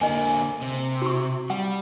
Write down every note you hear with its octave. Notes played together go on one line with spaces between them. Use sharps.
D3 A#3 D#5 G#5
C3
F#4 C#6
G3 F#5